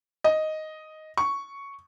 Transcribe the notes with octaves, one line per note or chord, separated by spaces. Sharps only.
D#5
C#6